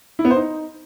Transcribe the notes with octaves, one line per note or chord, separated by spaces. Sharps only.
E4
B3
C5
D#4